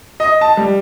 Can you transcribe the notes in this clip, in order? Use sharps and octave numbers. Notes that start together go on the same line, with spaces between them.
D#5
A5
G3